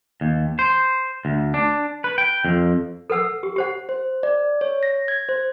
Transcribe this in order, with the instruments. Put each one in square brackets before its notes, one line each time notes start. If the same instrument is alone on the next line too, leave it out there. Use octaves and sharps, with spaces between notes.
[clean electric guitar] D#2
C5
D2
D4
B4
G5
F2
[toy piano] A4 B4 F#5 E6
G4
G4 C5 F#5
[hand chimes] C5
D5
C#5
A#6
G#6
C5